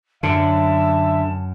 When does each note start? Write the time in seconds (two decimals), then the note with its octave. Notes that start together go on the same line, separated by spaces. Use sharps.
0.23 F#2 D3 E5 A5